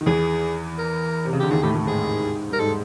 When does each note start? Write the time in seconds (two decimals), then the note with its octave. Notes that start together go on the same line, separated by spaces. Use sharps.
0.01 D#3
0.06 E2 E3 G#4
0.78 A#4
1.25 C3
1.33 C#3
1.40 D3 G4
1.51 D#2 D#3 G#4
1.62 A2 A3 G4
1.75 A2 A3
1.87 G#2 G#3 G#4
2.50 G3 A#4
2.59 G#2 G#3 A4